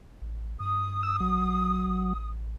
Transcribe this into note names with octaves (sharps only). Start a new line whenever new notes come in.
A1
G2 D#6
E6
A#1 F#3
A1